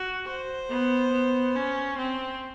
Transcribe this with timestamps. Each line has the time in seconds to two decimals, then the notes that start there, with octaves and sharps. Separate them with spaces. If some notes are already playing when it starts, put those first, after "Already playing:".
Already playing: F#4
0.26 C5
0.69 B3
1.12 B3
1.55 C#4
1.98 C4